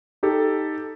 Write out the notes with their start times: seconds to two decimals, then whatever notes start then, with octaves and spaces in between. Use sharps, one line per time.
0.23 D#4 G4 A4